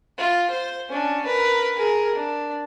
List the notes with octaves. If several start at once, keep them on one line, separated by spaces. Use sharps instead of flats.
F4
C5
C#4 D4
A#4 B4
G#4 A#4
D4